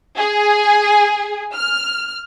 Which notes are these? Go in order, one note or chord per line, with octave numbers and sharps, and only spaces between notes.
G#4
F6